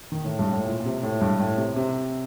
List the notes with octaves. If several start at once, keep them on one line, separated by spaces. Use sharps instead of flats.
D#3
A2
G2
A2
A#2
A#2
C3
A2
G2
A2
C3
C3